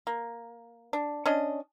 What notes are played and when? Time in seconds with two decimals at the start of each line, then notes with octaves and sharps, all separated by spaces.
0.07 A#3
0.93 D4
1.26 C#4 D4 D#5